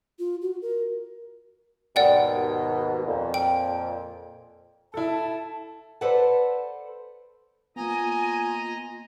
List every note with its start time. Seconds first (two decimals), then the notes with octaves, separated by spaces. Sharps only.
0.19 F4
0.42 F#4
0.62 A#4
1.96 D#2 G#2 B2 D5 F#5 G5
3.06 F2 A#2
3.34 G5
4.94 E4 A4 A5
6.01 A4 B4 C5 D5 F#5 A5
7.76 A#3 B3 F4 D#5 G#5 A#5